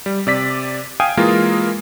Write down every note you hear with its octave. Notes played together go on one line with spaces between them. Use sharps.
G3
C3 D5 B6
F5 G5 G#5 D#6
E3 G#3 A#3 F4 A#4